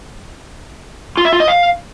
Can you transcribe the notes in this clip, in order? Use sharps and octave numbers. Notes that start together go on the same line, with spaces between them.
F4
E5
F4
D#5
F5